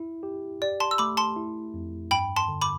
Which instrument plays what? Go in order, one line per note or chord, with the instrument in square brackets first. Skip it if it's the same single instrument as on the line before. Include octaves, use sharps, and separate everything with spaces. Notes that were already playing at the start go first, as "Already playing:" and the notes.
Already playing: [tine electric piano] E4
G4
[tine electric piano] G4 [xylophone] D5
[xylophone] A5 C6
E6
[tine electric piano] A3 [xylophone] B5 D6
[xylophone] A5 C6
[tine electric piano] E4
F2
[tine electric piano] G2 [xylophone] G5 B5
[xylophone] A5 C6
[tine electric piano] D3
[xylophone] B5 D6